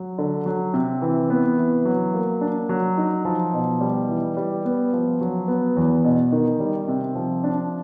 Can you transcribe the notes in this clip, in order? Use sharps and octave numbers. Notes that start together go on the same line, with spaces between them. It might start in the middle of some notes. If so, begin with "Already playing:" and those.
Already playing: F#3
D3
F#3
C3
E3
B3
E3
F#3
A#3
D4
F#3
D#4
F3
B2
G3
E3
G3
B3
F3
F#3
B3
E2
B2
D#3
G3
C3
F3
D4